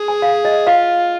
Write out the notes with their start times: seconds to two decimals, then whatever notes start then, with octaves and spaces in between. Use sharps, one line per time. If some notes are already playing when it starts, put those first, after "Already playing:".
Already playing: G#4
0.08 G#5
0.22 F5
0.45 D#5
0.67 F4 F5